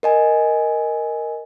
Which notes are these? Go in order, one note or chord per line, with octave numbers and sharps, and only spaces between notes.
A#4 D#5 G#5